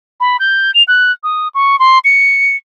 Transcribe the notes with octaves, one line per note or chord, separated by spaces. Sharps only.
B5
G6
F7
F#6
D#6
C#6
C6
C#7